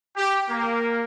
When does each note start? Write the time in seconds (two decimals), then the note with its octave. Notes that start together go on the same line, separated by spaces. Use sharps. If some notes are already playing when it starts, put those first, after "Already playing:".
0.17 G4
0.50 A#3